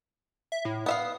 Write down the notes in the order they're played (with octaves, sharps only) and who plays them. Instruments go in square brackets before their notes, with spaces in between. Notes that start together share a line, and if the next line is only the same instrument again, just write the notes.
[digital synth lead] E5
A2
[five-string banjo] B3 E5 F5 [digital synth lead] D#6